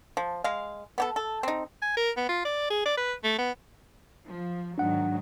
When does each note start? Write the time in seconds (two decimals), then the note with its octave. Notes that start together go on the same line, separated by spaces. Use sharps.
0.17 F3
0.44 G#3 F5
0.98 B3 G4 A4
1.16 A4
1.43 C4 D#4
1.82 G#5
1.97 A#4
2.17 B3
2.29 F4
2.45 D5
2.70 G#4
2.86 D5
2.97 B4
3.24 A3
3.38 B3
4.27 F3
4.78 G#2 D#3 F#3 D4 F#5